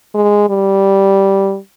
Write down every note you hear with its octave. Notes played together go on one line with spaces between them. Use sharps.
G#3
G3